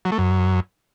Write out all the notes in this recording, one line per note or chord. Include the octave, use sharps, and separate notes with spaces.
F#3
A3
F#2